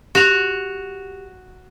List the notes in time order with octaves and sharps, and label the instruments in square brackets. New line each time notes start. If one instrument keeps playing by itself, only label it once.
[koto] F#4 [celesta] G4 F7